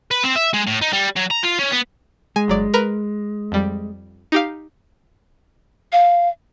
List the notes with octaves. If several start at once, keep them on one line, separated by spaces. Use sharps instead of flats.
B4
C4
E5
G#3
A2
D#4
G3
F#3
A#5
F4
C#4
B3
G#3 G#5
G1 F#3 D5
A#4 B4 A#5
F2 G3
D#4 G4 F5
F5